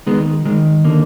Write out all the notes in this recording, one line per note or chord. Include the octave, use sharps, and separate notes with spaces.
D#3 G#3 B3
D#3 G#3
D3 A#3